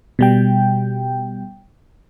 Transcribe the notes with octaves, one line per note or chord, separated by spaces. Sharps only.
B2 G3 G5